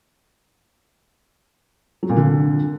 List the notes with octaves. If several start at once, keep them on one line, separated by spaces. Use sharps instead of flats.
F#3
A#2
D3